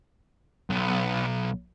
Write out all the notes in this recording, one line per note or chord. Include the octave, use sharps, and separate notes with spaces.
B1